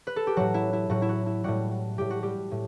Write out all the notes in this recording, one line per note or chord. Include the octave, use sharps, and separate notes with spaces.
B4
A4
G4
A2 F#3 F#4
E4
E4
A2 F#3 F#4
E4
F#4
E4
A2 G3 F#4
F#4
A2 G3 G4
F#4
G3 G4
A2